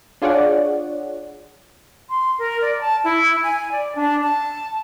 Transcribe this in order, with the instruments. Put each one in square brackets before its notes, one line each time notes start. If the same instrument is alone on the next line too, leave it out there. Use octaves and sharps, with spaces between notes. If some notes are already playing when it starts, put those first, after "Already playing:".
[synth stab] D4 F4 G#4 C#5 D5 F#5
[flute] C6
A#4
D5
A5
E4
G#5
D5
D4
A5